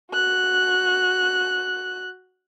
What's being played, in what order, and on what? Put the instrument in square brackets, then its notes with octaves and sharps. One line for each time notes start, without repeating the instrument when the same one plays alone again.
[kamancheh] F#4 F#6